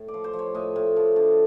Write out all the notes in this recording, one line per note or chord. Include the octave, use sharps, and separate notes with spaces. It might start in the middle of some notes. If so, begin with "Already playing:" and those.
Already playing: A2
D5
F3
C5
F3
C#5
A2 D#5
A2
F3
D3